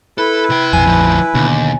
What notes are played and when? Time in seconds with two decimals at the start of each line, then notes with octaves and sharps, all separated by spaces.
0.18 E4 A4 B4
0.50 C3 G5
0.73 A#1 F2 G#5
0.87 D2 F3
1.34 D#2 B2 D3